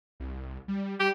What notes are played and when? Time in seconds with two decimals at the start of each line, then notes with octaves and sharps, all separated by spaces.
0.20 C2
0.68 G3
1.00 G3 G4